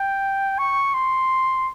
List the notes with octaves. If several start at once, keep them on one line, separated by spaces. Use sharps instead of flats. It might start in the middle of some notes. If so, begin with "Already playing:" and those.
Already playing: G5
C#6
C6